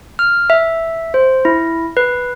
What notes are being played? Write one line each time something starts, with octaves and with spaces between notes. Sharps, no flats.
F6
E5
C5
E4
B4